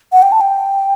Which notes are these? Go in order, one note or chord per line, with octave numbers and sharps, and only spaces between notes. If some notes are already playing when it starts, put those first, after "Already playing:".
F#5
G5
A5
G5